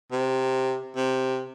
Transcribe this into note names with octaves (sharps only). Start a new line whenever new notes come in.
C3
C3